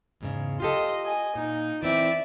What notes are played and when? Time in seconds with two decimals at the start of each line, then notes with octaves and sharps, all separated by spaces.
0.21 E2 G#2 C#3
0.60 F4 G4 A4 D#5 C6
1.04 D#5 G#5
1.35 A#2 D#4
1.83 E3 C4 D5 E5